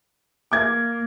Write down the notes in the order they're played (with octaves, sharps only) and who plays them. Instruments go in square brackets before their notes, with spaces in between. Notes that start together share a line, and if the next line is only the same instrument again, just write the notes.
[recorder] A#3 [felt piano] D6 G#6